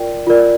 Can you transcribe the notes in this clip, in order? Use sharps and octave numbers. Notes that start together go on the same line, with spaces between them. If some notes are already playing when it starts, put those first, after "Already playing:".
Already playing: F4 A#4 D5 G5
F4 A#4 D5